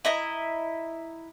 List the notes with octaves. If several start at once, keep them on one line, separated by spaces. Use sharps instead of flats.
E4 D#5 A#5